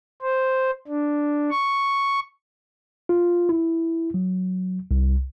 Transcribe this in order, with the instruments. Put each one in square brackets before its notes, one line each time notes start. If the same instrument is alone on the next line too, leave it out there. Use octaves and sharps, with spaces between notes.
[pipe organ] C5
D4
C#6
[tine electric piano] F4
E4
F#3
C2